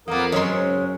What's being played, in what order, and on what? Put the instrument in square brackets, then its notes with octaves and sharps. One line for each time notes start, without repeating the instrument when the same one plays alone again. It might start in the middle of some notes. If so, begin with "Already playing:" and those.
[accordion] F2 A#4 D#6 [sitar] A#3 B3
[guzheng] F#2 E5 C6 [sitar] G#3 C#5
[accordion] G#2 C#3